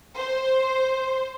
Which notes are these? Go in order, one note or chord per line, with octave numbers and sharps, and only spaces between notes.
C5